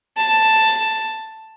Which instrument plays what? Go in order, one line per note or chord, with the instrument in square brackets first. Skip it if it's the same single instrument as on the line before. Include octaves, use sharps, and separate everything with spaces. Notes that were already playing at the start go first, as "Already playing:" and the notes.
[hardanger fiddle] A5